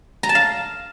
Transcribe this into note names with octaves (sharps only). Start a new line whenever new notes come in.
A#5
A5
F5